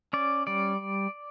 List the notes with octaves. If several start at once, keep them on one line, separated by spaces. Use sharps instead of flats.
C#4 D5
G3 D5